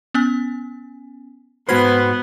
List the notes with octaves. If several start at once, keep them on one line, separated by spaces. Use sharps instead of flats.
B3 C#4 G#5
G#2 B3 F#4 B4 C5 B5 F6 G#6